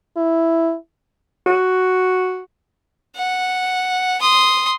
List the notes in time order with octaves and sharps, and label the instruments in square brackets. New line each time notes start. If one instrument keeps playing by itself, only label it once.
[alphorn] E4
[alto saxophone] F#4
[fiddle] F#5
C6 D#6